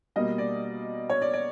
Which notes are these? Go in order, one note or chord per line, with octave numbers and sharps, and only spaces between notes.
B2 G3 A#3 D#5
D5
C#5
D5
D5